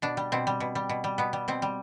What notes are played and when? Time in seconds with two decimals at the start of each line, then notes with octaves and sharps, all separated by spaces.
0.02 B2 D4
0.17 G3
0.32 B2 C4
0.47 G3
0.60 B2
0.75 G3
0.89 B2
1.04 G3
1.18 B2 B3
1.33 G3
1.48 B2 C4
1.62 G3